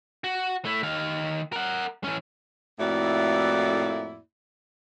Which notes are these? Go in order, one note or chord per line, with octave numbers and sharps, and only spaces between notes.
F#4
A3 E4
D#3 F5
A#4 F#5
E3 C#4
F2 A2 A#3 E4 F#4 D5